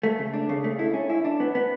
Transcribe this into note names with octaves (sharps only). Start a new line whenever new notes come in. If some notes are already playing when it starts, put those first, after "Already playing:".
A3
C#3
D4
C#3
A3
E4
C#4
E4
D4
B3
B3